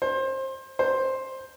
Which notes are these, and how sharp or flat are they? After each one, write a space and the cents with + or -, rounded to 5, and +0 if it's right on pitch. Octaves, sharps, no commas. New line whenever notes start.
C5 +25
C5 +10